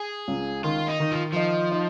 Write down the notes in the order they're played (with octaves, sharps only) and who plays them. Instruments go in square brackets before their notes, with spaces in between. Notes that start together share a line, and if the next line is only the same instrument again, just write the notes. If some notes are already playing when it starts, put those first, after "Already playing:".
Already playing: [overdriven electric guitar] G#4
[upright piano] C#2
[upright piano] D#3 [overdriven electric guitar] F4
[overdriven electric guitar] D#4
[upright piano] D#3
[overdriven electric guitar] F3
[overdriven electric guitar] F3 [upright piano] D#4
[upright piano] D#4